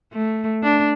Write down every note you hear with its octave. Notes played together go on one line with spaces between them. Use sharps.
A3
D4